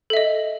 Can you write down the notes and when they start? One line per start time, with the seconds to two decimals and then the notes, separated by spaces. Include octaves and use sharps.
0.10 A4
0.13 E5
0.17 D#5